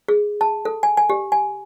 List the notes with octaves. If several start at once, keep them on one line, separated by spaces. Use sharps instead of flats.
G#4
A5
A4
G#5
G#5
G4
G#5